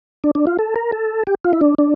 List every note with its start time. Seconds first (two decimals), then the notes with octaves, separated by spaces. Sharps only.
0.24 D4
0.35 D4
0.47 F4
0.59 A4
0.76 A#4
0.92 A4
1.27 G4
1.44 F4
1.53 E4
1.61 D4
1.78 D4